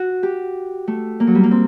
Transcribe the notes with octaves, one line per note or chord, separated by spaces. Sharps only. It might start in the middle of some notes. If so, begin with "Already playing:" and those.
Already playing: F#4
G4
A3
A#3
F#3
G3
A#3
C4